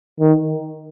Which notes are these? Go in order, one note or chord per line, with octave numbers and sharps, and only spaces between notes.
D#3